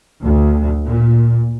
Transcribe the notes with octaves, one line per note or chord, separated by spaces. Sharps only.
D2
A#2